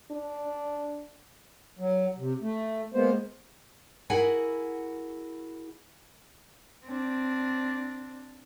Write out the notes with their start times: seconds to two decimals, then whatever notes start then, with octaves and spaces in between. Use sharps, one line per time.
0.11 D4
1.79 F#3
2.18 C3
2.42 A3
2.94 G#3 A#3 B3 C5
4.10 E4 F#4 G#4 A#4 F#5 G#5
6.86 C4 D4